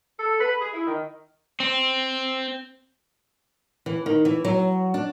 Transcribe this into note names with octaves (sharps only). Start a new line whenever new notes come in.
A4
B4
G#4
E4
D#3
C4
E3
D#3
E3
F#3
D4